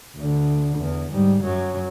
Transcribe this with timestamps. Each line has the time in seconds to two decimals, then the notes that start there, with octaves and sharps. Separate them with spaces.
0.16 D2 D3
0.78 E2
1.12 G#2 G3
1.43 F#2 F#3